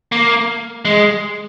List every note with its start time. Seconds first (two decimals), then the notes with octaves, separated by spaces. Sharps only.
0.12 A#3
0.85 G#3